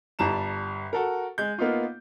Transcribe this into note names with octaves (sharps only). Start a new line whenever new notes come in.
G1 G3 A5 A#5 E7
F#4 A4 A#4
G#3 G6
A#3 B3 D#4 F4